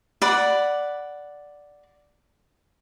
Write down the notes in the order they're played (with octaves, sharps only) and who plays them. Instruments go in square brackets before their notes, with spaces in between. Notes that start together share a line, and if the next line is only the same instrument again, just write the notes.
[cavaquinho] D5 F#5 B5